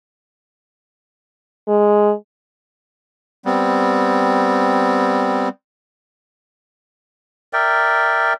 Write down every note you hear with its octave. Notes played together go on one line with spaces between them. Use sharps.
G#3
G3 B3 C4
A#4 D5 E5 G5